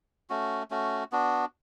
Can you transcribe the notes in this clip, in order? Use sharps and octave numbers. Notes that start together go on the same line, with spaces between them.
A3 C#4 F#4
A3 C#4 F#4
B3 D4 F#4